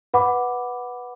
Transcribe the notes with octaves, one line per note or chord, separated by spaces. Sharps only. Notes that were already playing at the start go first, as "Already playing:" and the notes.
B4 F#5 B5 D6